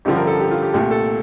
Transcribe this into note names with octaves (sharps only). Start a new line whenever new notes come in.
A1 G2 D3 F3 G4
A#4
A4
G4
F4
G4
C2 A#2 A3 G4
A4